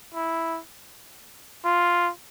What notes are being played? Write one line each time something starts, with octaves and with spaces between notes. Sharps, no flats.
E4
F4